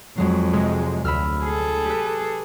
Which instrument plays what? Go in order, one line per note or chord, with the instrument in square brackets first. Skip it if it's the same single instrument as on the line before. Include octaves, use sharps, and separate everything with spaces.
[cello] F2 [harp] F#3 G#3 F#4
[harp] C3 [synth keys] G#3
[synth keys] D2 [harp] B5 E6 F6
[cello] G#4 A4
[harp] G4 B4